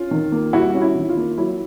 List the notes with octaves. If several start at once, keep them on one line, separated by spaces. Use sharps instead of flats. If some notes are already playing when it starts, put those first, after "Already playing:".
Already playing: C#4 F4
D#3
A#3
G3 E4 F#4
C#4
E4
D#3
F4
A#3
F#3 E4